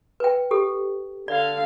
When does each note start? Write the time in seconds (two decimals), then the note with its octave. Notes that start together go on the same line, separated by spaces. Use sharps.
0.20 B4 G5
0.51 G4 A4
1.28 D3 D5 F5